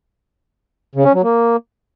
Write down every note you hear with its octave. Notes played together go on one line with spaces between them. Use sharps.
C#3
C#4
F#3
A#3